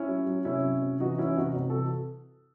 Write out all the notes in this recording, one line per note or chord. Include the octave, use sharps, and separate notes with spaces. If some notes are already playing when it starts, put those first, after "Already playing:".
Already playing: C#4 E4
F#3
F#3
C3 C#4 E4
F#3
C3
E3 D#4 F#4
E3 C#4 E4
C3 D#4 F#4
C3
E3 F#4 A4